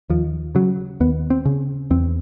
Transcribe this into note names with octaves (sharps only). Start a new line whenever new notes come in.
D#2 F3
C#3 F#3
D#2 B3
C4
C#3
E2 C4